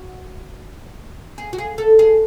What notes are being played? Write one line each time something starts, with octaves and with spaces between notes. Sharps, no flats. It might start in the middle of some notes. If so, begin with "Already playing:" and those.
Already playing: F#4
G#4
F#4
G#4
A4
G#4